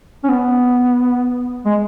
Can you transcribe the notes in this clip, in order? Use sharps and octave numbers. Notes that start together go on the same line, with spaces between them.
C#4
B3
G#3